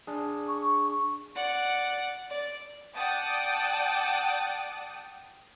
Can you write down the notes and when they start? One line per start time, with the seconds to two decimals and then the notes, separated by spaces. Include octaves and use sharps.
0.07 D4 G#4
0.48 C#6
1.35 D5 F#5
2.30 D5
2.94 D5 F#5 G5 A5 D#6